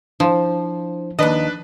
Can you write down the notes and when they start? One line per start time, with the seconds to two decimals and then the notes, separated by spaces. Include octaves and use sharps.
0.20 F3 D4 E4 C5
1.19 D#2 D#3 D4 B4 D#5